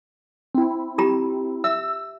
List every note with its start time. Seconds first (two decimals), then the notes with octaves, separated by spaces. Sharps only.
0.55 C4 E4
0.98 F4 G4 A#5
1.64 E5 E6